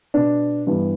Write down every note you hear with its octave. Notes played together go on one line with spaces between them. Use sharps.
B2 B3 D4
G2 E3 B3